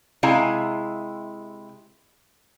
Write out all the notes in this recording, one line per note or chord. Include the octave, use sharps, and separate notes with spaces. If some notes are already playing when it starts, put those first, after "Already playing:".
C3 G#3 E4 F5 G#5 A#5